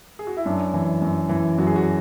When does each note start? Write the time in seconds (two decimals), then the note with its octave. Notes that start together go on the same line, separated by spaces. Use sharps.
0.19 G#4
0.27 F#4
0.37 E4
0.46 F#2 D4
0.74 E3
1.02 F#2
1.29 E3
1.58 F#2 F#4
1.67 G#4
1.76 F#4